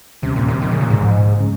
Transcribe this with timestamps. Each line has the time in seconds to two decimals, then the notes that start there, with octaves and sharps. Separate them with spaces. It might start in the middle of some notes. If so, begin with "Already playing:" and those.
0.22 D#2 C3 D#3 G3 C#4
0.36 A#2
0.48 C3
0.61 A#2 D#3 F3 G#3
0.71 C#3
0.81 A#2
0.90 G#2
1.00 C2 A#2 F3
1.40 C#3 G#3 C#4